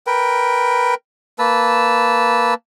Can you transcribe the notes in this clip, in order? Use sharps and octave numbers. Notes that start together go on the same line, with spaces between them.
A#4 B4 G5
A#3 B4 A5 E6